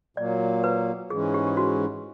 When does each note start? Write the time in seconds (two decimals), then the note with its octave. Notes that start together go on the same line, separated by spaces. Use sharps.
0.17 A#2 F#3 A#3 D5
0.64 B4
1.10 G#2 E3 G#3 C#4 G#4
1.34 G4
1.47 G4
1.57 F#4